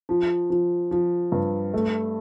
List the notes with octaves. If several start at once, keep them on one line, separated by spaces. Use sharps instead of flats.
F3
F3
F3
G2
A3